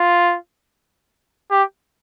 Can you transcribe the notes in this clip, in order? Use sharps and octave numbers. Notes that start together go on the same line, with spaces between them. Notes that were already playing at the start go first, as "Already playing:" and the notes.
Already playing: F4
G4